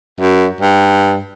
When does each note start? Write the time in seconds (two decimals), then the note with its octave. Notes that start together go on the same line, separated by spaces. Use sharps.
0.21 F#2
0.61 G2